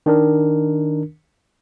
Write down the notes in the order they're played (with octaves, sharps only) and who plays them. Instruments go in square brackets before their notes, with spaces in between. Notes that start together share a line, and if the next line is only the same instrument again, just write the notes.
[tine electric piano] D#3 D4 A#4